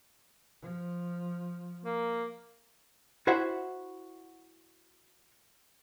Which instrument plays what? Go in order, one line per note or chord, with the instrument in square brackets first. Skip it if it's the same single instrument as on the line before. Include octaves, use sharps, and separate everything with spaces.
[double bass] F3
[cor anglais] A#3
[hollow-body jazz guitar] E4 F#4 C5 E5 F#5